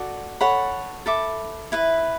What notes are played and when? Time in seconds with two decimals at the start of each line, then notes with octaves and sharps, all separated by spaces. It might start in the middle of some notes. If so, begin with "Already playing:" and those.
Already playing: F#4 A4 D5
0.41 A4 C#5 F#5 B5
1.06 A4 E5 B5 D6
1.72 E4 B4 E5